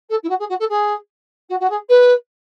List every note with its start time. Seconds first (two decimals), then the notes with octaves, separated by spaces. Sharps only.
0.09 A4
0.23 E4
0.29 F#4
0.39 G#4
0.49 F#4
0.59 A4
0.69 G#4
1.49 F#4
1.59 F#4
1.69 G#4
1.89 B4